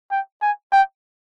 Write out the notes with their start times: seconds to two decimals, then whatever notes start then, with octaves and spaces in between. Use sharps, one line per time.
0.11 G5
0.42 G#5
0.72 G5